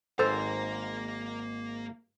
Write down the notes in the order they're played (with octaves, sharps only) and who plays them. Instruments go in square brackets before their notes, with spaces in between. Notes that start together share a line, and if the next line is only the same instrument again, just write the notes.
[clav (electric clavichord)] G#1 G#2 [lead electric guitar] A#3 A#5 [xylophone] A4 E6 A6 [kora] C5